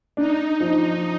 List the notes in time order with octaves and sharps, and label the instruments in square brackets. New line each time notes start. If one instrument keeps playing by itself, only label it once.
[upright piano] D4 [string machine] D#4
[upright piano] F3